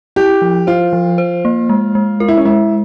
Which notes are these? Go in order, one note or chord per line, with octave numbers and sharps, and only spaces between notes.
E4 G4
F3
F4 C5
F3
C5
A#3
G#3
G#3
F4 A#4
E4
C#4
G#3 E4